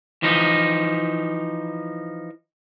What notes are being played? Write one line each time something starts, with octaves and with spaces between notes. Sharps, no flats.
E3 F3 D#4